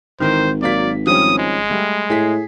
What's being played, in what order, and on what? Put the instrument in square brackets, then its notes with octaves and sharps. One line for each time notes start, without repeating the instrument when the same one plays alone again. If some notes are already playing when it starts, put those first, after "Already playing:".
[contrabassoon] G#1 [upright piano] D#3 E3 A#4 [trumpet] C5
[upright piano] F#3 A#3 B6 [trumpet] D5
[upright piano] F3 G3 C#4 [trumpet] D#6
[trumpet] G#3
[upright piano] G3 A3
[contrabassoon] A2 [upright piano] G#4 B6